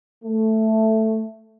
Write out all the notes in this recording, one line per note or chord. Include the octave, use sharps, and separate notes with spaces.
A3